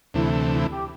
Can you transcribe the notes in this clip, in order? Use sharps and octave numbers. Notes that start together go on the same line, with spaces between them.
D2 C3 E3 A3 E4
E4
G4